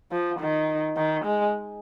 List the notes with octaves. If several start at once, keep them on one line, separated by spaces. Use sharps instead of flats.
F3
D#3
D#3
G#3